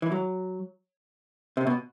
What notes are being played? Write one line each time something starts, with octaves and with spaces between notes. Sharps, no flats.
E3
F#3
C3
B2